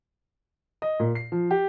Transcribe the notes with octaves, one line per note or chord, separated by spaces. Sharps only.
D#5
A#2
C7
F3
G4